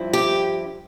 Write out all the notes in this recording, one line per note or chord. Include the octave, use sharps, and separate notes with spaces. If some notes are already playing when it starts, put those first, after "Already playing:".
Already playing: G2 F3 C4 E4
G4